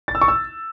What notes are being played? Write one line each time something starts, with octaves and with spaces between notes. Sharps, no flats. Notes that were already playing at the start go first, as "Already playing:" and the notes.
A6
E6
C#6
E6